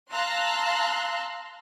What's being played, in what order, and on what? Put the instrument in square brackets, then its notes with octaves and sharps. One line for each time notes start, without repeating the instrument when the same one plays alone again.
[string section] F5 A5 A#5 C6 E6 F#6